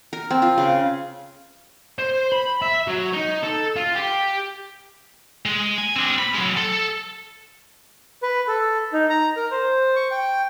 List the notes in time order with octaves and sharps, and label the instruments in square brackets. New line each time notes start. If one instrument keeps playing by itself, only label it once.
[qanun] A#4
C4
F4
C#3
[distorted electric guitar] C5
B5
E5
F#3
D#4
A4
F4
G4
G#3
G#5
C4 D4
B5
F#3 G#3
A4
[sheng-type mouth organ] B4
A4
D#4
A#5
A#4
C5
C#6
G5